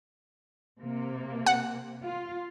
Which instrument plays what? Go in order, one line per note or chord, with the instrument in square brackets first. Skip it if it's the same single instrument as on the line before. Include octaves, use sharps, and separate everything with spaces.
[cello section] C3 A#3
[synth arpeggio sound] F#5
[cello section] F4